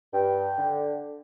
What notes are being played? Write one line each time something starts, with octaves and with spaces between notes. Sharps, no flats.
G2 G5
D3